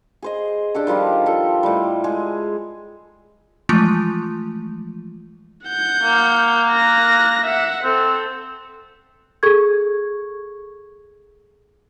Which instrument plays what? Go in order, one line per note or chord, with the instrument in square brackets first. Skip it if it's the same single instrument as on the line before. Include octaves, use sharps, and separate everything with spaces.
[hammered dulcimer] G#4 C5 D#5
D4 G4 A4
D#3 F3 G3 F4
A4 G5
A2 G3
G#3 G#4
[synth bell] E3 F3 G#3 A3 F4
[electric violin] F#5 G6
[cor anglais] A#3
[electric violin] F#6 A#6
E5 F#5
[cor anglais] C4 [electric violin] A4
[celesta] G#4 A4 C#6 G#6